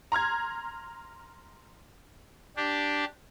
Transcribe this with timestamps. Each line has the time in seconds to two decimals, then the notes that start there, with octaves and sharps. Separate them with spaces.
0.12 A#5 C6 F6 G#6
2.57 D4 G4